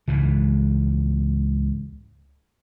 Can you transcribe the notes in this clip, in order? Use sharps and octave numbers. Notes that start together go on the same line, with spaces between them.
C#2 G#2 E3